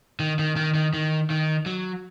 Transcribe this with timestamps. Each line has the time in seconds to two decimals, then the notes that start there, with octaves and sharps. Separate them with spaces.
0.20 D#3
0.39 D#3
0.56 D#3
0.74 D#3
0.94 D#3
1.30 D#3
1.66 F#3